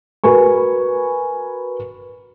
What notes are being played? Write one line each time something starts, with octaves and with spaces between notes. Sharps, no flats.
F#4 A#4 B4 G#5 C#6